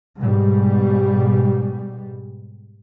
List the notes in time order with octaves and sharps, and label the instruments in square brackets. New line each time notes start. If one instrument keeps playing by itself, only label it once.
[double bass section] G#2 B2 G3